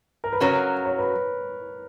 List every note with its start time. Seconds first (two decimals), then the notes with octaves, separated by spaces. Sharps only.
0.24 A#4
0.33 B4
0.40 C#3 F#3 C#4 F#4 A#4 C#5
0.85 C#5
0.98 B4